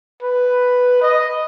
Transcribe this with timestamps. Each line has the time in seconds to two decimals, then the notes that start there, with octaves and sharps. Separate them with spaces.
0.22 B4
1.01 D#5